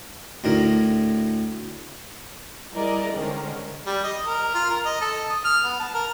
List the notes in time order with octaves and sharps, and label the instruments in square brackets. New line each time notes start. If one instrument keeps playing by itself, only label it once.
[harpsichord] D2 A2 A#4
[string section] G3 E4 G#4 A#4 D5 D#5
D3 D#3 G#3 C#4 A#4 C5
[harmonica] G3
D#5
A#4
F4
A#4
D#5
A4
D#6
F6
B3
A5
A#4